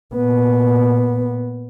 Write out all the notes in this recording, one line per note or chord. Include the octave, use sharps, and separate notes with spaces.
A#2 B3